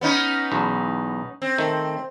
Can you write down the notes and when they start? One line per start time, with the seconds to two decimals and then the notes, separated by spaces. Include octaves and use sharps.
0.01 B3 C#4 D#4
0.52 B1 E2
1.42 C4
1.58 D#3 A3